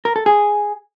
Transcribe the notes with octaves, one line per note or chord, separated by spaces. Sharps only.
A#4
A4
G#4